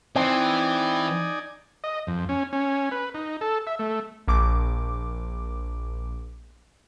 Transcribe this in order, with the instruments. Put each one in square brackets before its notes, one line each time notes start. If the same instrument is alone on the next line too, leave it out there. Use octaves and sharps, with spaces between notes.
[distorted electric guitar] E3 [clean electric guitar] C4 [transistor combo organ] D#4 D5 G#5
[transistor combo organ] D#5
F2
C#4
C#4
B4
D#4
A4
E5
A3
[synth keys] A#1 D6